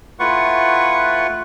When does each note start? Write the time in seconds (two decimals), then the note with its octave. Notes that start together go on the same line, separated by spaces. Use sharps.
0.20 A3 E4 F4 B4 F#5 C#6